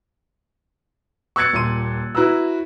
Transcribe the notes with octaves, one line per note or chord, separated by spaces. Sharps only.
C#6 E6 F#6 G#6 A6 C#7
D#1 A#2 C6 D#7
E4 F#4 B4 A#5 E6